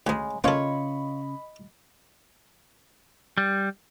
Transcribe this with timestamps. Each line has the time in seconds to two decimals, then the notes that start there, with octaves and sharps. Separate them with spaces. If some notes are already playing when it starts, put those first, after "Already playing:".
0.07 D2 C#3 G#3
0.44 C#3 A#3 C#4 F4 A4 C#5 D#5 B5
3.38 G3